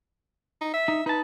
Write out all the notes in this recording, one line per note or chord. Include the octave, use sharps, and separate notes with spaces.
D#4
E5
D#4
D#4 B4 A5